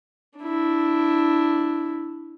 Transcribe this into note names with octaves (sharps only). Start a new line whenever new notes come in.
D4 E4